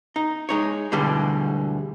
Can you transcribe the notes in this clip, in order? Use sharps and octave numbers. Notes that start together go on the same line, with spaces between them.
D#4
G#3 D#4 C#5
D2 B2 D3 E3 G3 G#3